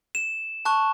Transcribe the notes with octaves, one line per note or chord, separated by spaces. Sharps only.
E7
A5 C#6 F#6